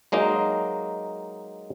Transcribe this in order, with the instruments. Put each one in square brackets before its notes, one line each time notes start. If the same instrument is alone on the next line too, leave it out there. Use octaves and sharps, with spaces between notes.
[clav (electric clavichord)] F#3 G#3 A#3 D#4